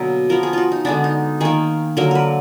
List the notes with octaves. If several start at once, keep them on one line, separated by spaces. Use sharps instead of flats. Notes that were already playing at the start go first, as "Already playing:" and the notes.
Already playing: B2 D3 F#3 A#3
F3 B3 A#4
G#4
F4 F#4
D#4
D3 G#3 B3 D4
D#4
D#3 A#3 G#4
D3 F#3 A#3 A#4
A#4 B4